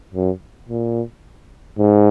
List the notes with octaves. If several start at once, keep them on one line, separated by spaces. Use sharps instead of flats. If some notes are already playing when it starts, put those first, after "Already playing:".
F#2
A#2
G#2